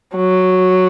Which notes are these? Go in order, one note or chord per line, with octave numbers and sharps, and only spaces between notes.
F#3